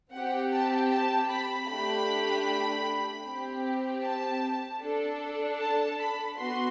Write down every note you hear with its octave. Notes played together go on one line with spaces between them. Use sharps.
C4 G4 F#5
A5
A5
B5
A3 D4 G4 B5
C4 G4
A5
D4 A4
A5
B5
B3 F#4 C6